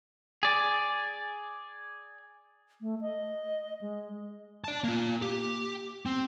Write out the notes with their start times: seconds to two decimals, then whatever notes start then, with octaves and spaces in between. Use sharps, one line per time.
0.43 G#4 D5
2.81 A3
3.01 D#5
3.81 G#3
4.64 D5 A5
4.84 A#3 F4
5.22 G4
6.06 C4